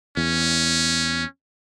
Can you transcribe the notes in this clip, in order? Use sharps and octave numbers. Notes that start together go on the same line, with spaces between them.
E2 C#4